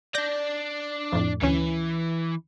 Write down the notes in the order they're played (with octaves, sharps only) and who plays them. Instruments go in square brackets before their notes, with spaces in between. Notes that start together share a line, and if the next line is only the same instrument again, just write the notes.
[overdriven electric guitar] D4 D5 [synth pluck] G6 A#6
[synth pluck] F2 A2
[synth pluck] D2 C#4 [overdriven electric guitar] E3